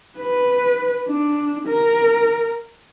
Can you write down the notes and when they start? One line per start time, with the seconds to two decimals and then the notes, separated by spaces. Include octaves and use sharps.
0.19 B4
1.08 D4
1.68 A#4